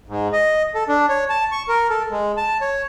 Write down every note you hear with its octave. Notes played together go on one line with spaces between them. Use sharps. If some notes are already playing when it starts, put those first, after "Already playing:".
G#2
D#5
A4
D4
C#5
A5
C#6
A#4
A4
G#3
A5
C#5